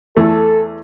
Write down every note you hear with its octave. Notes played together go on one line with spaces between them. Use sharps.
E2 A3 A4